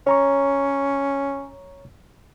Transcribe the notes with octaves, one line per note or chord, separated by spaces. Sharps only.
C#4 C#5 A#5 C#6